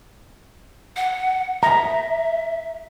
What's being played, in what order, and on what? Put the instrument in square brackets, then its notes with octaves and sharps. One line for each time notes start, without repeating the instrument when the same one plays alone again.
[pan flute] F#5
[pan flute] E5 [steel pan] A#5